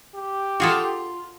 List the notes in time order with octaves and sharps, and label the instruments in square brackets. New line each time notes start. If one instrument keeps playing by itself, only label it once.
[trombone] G4
[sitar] F4 [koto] F#4 G#4 A4